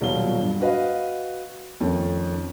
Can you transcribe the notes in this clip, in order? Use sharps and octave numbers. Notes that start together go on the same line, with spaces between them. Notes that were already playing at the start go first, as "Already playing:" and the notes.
D#1 B2 F#3 G3 F4 G7
G2
F#4 B4 D#5 F5
F2 D#3 A3 C#4